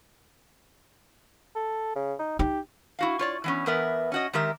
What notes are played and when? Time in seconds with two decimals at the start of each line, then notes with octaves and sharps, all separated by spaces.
1.56 A4
1.96 C#3
2.19 D#4
2.39 D#4 G4
2.99 E4 F#4 F5
3.19 F4 C#5 D5
3.44 E3 B3 C#4
3.66 E2 E3 B3 A#4 B4 E5
4.12 C#4 F#4 D#5
4.33 D#3 G#3 G4 A#4 E5